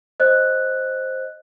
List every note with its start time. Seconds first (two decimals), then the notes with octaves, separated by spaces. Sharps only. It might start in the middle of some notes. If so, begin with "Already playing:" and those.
0.20 C5 D#5 F#6